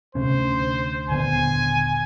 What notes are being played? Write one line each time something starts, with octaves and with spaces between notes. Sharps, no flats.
D2 C3 C#4 C5
D#1 D3 B3 G#5